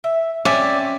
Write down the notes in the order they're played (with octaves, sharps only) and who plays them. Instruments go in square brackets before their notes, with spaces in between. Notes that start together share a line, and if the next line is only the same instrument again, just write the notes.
[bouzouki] E5
[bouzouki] C4 [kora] C#4 [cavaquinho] D5 E5